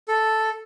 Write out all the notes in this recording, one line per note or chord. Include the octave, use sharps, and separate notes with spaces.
A4